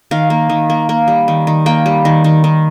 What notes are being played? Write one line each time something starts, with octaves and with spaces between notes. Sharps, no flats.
D#3 F5
A#3
D#3
A#3
A#3
G3
D#3
D#3
A#3 G5
G3
D#3
D#3
D#3